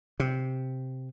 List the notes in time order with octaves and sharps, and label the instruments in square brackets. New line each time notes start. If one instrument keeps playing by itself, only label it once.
[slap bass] C3